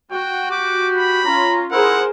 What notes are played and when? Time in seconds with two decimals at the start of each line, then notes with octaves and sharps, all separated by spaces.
0.12 F#4 G5
0.51 G4 D6
0.95 B5
1.25 C#4 F4 A#5
1.72 E4 G#4 A#4 C5 F#5